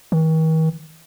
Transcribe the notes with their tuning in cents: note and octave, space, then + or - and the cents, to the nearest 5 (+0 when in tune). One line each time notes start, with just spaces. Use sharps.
D#3 +45